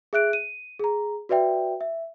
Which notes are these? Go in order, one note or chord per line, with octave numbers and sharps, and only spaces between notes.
G#4 E5 F#6 D7
D#7
G#4 A#5
F#4 B4 D5 E5 G5
E5